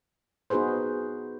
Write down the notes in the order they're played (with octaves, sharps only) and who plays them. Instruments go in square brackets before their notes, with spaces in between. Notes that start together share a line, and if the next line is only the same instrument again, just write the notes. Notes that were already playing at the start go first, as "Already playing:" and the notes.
[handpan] B3 D#4 F#4 G#4 B4 C5